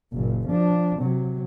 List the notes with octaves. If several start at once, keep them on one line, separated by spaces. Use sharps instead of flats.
F#1 A#2
F3 D4
C3 F#3